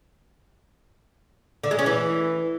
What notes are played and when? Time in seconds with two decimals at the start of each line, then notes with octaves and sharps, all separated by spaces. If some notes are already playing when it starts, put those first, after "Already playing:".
1.63 D3
1.71 G#3
1.79 C#4
1.86 E3